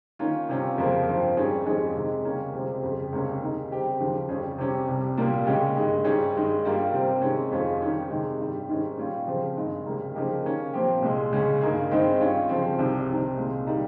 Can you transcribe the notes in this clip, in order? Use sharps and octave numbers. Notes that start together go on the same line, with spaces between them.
D#3 A#3 C#4 F4
C3 G3 C#4 F4
F2 C#3 F3 A#3
G2 F3 C4 F4
G#2 G3 C#4 G#4
F2 D#3 G#3 C#4 G#4
C3 D#3 G#3
C#3 G3 A#3 C#4
C#2 C3 G3 C4 F4
F2 C#3 G3
C#2 C3 G3 A#3 C#4
D#2 D#3 A#3 D#4 G#4
C#3 G3 C4 G4
D#2 C#3 F3
F2 C#3 G3 C#4 G#4
C3 G3 C#4 G4
C2 C3 G3
C2 A#2 G3 A#3 F4
C#2 C#3 G#3 C#4 G4
G2 D#3 G#3 D#4
G#2 G3 C#4 G#4
G2 D#3 G#3
G2 G3 A#3 F4
C3 G3 C4
C3 D#3 G#3 C#4
F2 D#3 G#3 C#4 F4
D#3 G3 C#4 G#4
C3 D#3 G#3
G2 D#3 G3
G#2 D#3 G#3 C#4
A#2 G3 C#4 F4
C#3 F3 C4
G2 D#3 G#3
C#2 C3 G3 A#3
C#3 F3 A#3 D#4 G4
D#3 A#3 C#4
A#2 F3 C4 G4
C2 A#2 G#3
C#2 C#3 G#3 C#4
G2 D#3 A#3 D#4 G#4
G2 D#3 G#3 C4 D#4
G2 D#3 G3 C#4 F4
C#3 F3 C4
C2 C3 D#3 G3
C2 C3 D#3
C2 A#2 G#3
D#3 G3 A#3 D#4